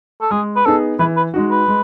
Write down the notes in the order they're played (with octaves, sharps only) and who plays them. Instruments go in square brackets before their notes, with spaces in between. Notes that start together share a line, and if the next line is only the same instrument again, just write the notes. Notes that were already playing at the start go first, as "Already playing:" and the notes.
[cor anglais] A4
[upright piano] G#3 [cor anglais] G#4
[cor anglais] B4
[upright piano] B3 D#4 G#4 [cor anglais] A4
[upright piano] E3 [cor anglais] B4
[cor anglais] B4
[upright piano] G#3 D#4 F#4
[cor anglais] B4
[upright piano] G#3